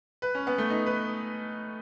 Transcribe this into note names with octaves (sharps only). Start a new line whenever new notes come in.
B4
C#4
B3
A3
D#4
B4